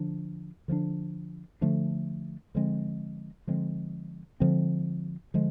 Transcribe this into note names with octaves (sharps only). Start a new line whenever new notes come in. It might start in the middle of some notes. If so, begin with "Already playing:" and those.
Already playing: D3 F3 D4
D3 F3 A3 D4
D3 F3 A3 D4
D3 F3 G#3 C4
D3 F3 G#3 C4
D3 F3 G#3 C4
D3 F3 G#3